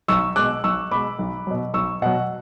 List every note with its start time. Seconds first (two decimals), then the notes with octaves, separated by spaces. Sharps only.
0.08 B1 C#6 E6
0.36 B2 G#3 D6 F#6
0.64 B1 C#6 E6
0.91 B2 G#3 B5 D6
1.19 B1
1.47 B2 F#3
1.74 B1 C#6 E6
2.02 B2 F#3 F#5